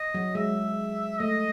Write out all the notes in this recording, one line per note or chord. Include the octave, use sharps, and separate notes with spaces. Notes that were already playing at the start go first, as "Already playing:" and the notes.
Already playing: D#5
F#3
G#3 E5
A3 D#5